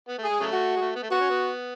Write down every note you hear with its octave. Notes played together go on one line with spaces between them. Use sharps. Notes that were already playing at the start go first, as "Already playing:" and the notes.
B3
A3 G#4
G#3
C#3 F#3 A3
F#4
G#3
A3
B3
A3
B3 F#4
C#4
B3